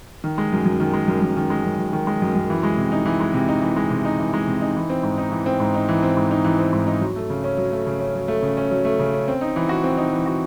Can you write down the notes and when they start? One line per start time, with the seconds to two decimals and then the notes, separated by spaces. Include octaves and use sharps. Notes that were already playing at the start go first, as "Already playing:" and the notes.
0.24 D#3
0.38 G#3
0.52 F#2
0.66 F#2
0.80 D#3
0.94 G#3
1.08 F#2
1.22 F#2
1.37 D#3
1.50 G#3
1.64 F#2
1.79 F#2
1.93 D#3
2.07 G#3
2.22 F#2
2.35 F#2
2.50 E3
2.63 G#3
2.78 C3
2.92 D#4
3.06 E3
3.20 G#3
3.34 C3
3.48 D#4
3.62 E3
3.76 G#3
3.90 C3
4.05 D#4
4.19 E3
4.34 G#3
4.47 C3
4.62 D#4
4.76 E3
4.90 C4
5.03 G#2
5.18 D#4
5.32 E3
5.46 C4
5.60 G#2
5.74 D#4
5.89 E3
6.03 C4
6.17 G#2
6.31 D#4
6.44 E3
6.59 C4
6.73 G#2
6.87 D#4
7.01 F#3
7.16 A3
7.30 C#3
7.44 C#4
7.58 F#3
7.72 A3
7.87 C#3
8.00 C#4
8.15 F#3
8.28 A3
8.42 C#3
8.57 C#4
8.71 F#3
8.85 A3
8.99 C#3
9.14 C#4
9.28 C4
9.41 D#4
9.56 E3
9.69 F#4
9.84 C4
9.97 D#4
10.13 E3
10.26 F#4